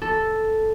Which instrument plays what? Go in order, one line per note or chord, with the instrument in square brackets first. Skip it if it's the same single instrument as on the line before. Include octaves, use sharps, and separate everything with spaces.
[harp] A4